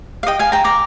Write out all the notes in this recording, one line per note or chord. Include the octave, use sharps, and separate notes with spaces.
F5
D#5 G5
F5 G#5
G5 A#5
A#5 D6